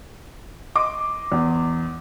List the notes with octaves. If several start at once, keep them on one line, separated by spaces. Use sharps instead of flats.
D#5 C6 D6
E2